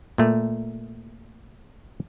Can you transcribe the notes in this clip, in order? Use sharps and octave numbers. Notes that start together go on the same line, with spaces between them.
A#2 A3